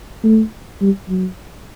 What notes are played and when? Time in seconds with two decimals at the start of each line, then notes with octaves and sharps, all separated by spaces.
0.24 A3
0.82 G3
1.09 F#3